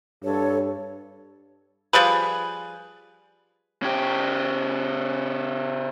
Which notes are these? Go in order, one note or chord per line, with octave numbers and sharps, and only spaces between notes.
G2 A4 C#5
F3 G3 G#4 B4
C#3 G4